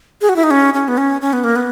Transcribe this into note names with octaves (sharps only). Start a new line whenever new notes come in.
G#4
F#4
E4
D#4
C#4
C#4
B3
C#4
C#4
B3
A#3
B3